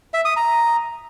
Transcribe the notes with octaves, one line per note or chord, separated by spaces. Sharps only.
E5
D#6
A#5